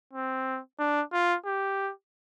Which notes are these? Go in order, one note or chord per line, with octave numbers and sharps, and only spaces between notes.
C4
D4
F4
G4